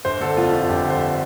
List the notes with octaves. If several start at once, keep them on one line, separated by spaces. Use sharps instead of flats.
G1 C5
D3 A4
F2 F4
G1 F4
G1 G4
D3
C5